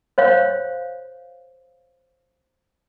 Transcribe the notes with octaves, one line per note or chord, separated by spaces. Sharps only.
C5 C#5 F5